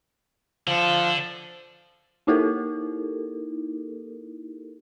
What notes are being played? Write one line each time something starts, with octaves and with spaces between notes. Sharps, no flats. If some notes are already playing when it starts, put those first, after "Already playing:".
D3 F3 A4
A#3 D#4 E4 G4 A4 A#4